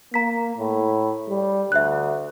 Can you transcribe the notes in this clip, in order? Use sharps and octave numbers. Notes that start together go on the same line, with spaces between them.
A#3 A#5 B6
A2
G3
D2 E5 F#6